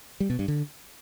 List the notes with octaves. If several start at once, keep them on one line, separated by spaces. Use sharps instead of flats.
G3
B2
G2
D3